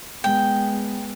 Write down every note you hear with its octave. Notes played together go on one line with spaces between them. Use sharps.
G#3 B3 G5